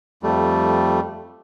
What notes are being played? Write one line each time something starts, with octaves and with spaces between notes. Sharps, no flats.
F2 G3 A3